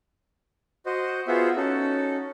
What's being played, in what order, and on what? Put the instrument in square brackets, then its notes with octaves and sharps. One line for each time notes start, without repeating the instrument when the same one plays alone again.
[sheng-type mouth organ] F#4 C5 D#5
B3 F4 F#4 G#4 C5 E5
C#4 D#4 F#4 A4